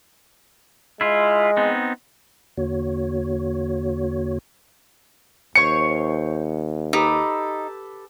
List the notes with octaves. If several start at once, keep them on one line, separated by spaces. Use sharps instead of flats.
G#3 E4 F4
B3 C4 D#4
E2 D3 A#3 F#4 C#5
D#2 C5 C#5 C#6 C#7
D#4 G4 A4 B4